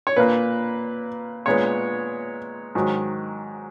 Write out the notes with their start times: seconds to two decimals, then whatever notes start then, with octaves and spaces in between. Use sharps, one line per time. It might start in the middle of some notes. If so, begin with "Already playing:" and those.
0.07 C#5
0.16 A#2 A#3 B4
1.46 A#2 G#3 B3 C#5
2.75 G#2 D#3 F#3